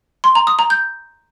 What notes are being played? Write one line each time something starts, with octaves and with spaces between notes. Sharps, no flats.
C6
A#5
D#6
A#5
G6